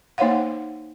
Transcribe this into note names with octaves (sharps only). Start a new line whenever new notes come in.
A#3 D#4 C5 C#5 F5 F#5